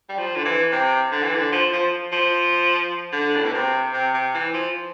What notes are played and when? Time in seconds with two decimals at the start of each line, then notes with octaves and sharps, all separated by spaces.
0.09 G3
0.18 F3
0.36 D3
0.45 E3
0.72 C3
1.12 D3
1.23 E3
1.35 D3
1.52 F3
1.73 F3
2.12 F3
3.13 D3
3.36 A2
3.44 B2
3.54 C3
3.93 C3
4.14 C3
4.34 E3
4.54 F3